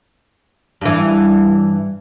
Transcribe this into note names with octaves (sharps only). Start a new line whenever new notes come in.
G2 E3